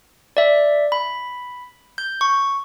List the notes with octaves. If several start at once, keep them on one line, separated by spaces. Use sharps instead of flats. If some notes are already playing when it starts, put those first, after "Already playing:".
D5 E5
B5
G6
C#6